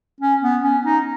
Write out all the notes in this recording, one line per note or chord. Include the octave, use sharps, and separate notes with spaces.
C#4
B3
C#4
D#4